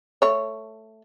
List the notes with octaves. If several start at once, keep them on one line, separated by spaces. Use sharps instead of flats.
A3 C#5